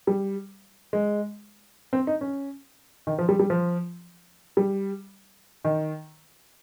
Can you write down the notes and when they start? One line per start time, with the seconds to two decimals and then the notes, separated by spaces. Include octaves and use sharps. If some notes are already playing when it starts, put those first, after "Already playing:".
0.07 G3
0.93 G#3
1.93 C4
2.07 D#4
2.21 C#4
3.07 D#3
3.19 F3
3.29 G3
3.39 G3
3.50 F3
4.57 G3
5.65 D#3